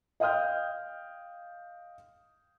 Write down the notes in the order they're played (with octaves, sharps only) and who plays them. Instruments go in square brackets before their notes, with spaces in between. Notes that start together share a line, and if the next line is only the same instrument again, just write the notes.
[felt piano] D#5 F5 G5 D#6 F6 G6